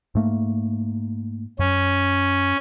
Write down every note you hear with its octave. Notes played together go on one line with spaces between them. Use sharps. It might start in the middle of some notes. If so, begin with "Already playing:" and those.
G#2 A3 A#3
F#2 C#4